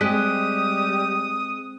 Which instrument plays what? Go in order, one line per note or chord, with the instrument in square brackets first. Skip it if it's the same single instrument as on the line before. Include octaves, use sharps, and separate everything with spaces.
[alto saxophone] G3 [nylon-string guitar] G#3 [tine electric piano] C4 F#6 B6 [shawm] D#6